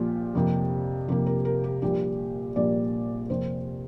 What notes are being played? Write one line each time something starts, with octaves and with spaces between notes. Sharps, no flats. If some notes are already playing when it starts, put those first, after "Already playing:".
Already playing: A#1 A#2 F3 F4 G4
F2 C3 A#3
F2 C3 A#3 G4
A#4
A#4
G4
A#1 A#2 G3 G4
A#1 A#2 G3 D5
F2 C3 A#3 C5